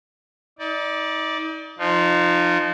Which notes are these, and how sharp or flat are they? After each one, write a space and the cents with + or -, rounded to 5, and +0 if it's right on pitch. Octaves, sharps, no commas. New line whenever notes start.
D#4 +35 D5 +0
F3 +0 D#4 -35